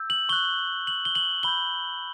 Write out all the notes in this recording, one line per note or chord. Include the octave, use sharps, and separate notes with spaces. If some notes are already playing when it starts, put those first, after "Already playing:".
Already playing: E6 G6
F#7
C#6 F#6 G7
F#7
G7
F#7
B5 E6 G6 G7